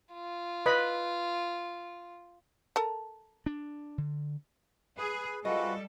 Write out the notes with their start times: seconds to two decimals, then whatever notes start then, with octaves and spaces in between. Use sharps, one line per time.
0.13 F4
0.66 B4 D#5 B5
2.76 A4 A#4 A5
3.46 D4
3.98 D3
4.98 G#4 B4
5.45 C3 G3 G#3 F4 F#4 A4 B4 D#5